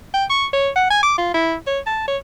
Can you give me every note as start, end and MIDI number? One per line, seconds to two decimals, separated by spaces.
0.14 0.24 79
0.30 0.46 85
0.53 0.69 73
0.76 0.86 78
0.90 1.00 80
1.03 1.15 86
1.18 1.32 65
1.34 1.55 64
1.67 1.79 73
1.86 2.04 81
2.08 2.17 73